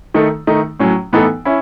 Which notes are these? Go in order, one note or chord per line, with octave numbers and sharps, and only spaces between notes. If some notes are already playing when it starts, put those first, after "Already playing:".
D#3 A3 D#4 A4
D#3 A3 D#4
A2 F#3 C#4
A2 E3 B3 D#4 A4
C#4 E4